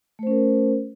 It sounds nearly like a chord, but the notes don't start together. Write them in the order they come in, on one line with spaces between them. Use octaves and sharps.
A3 C5 C#4 A#4